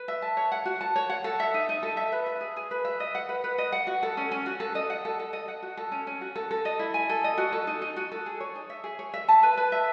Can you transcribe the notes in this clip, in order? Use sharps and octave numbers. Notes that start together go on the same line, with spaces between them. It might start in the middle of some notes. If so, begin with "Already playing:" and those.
Already playing: B4
E5
A5
C#5
F#5
F#4
A5
C#5
F#5
A4
E5
D#4
D#4
A4
E5
B4
E5
G#4
G#4
B4
E5
D#5
F#5
B4
B4
D#5
F#5
F#4
A4
C#4
C#4
F#4
A4
D#5
F#5
A4
A4
D#5
F#5
F#4
A4
C#4
C#4
F#4
A4
A4
D#5
E4
G#5
A4
D#5
F#4
A4
D#4
D#4
F#4
A4
G#4
C#5
D#4
E5
G#4
C#5
E5
A5
B4
B4
E5